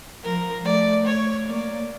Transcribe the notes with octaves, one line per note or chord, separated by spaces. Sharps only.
F3 A#4
A3 D5
C#5
A#3 D5